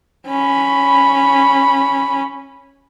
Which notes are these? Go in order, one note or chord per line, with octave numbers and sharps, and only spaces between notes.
C#4 B5